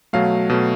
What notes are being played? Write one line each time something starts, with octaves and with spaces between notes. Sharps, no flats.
B2 F#3 A3 F5
B2 F#3 A3